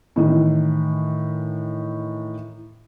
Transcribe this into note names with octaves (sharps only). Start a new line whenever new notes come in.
A2 D#3 E3